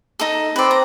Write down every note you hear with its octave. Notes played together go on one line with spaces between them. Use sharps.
D#4 A4
C4 B4 D5
A#5